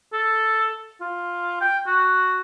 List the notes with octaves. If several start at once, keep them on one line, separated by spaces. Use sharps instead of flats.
A4
F4
G5
F#4